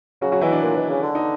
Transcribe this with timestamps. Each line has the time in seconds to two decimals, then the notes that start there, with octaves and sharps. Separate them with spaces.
0.21 C#3 F#3 F#4
0.32 F#3 F#4
0.41 B2 E3 E4
0.52 D4
0.62 A#2
0.76 B2
0.89 C#3
1.02 D3
1.15 D#4